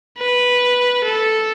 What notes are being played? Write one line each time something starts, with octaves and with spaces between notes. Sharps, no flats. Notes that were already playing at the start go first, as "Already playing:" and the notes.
B4
A4